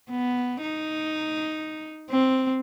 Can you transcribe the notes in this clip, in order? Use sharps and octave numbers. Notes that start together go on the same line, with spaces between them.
B3
D#4
C4